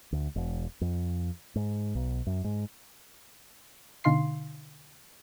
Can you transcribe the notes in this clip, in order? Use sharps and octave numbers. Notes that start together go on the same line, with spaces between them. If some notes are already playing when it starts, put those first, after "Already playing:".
D2
E1
F2
G#2
B1
F#2
G#2
B2 D3 D#4 F5 C6 C7